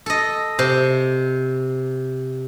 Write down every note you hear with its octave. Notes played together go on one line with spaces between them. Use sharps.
A4 D#5
C3